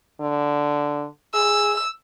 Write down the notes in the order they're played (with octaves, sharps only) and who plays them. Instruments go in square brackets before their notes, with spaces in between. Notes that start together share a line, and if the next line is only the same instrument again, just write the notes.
[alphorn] D3
[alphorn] G#4 [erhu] E6